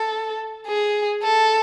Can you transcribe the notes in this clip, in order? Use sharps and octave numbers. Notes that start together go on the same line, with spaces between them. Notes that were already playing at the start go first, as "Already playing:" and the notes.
Already playing: A4
G#4
A4